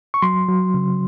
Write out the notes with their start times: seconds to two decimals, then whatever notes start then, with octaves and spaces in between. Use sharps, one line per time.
0.14 C#6
0.22 F#3 C6
0.49 F#3
0.74 C#3